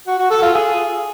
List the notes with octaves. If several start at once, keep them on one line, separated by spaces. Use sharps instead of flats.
F#4
F#4
A4
F4
G#4